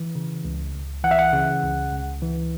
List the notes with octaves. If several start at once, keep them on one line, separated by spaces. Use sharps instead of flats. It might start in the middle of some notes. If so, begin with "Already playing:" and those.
Already playing: E3
C#3
C#2
C#2
E3 F#5
E5
F#5
C#3
C#2
C#2
E3